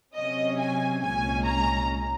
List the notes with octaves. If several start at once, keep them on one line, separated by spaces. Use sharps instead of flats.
C3 F#3 C#4 D#5
G#5
C2 A#2 G#3 C#4 G#5
A#5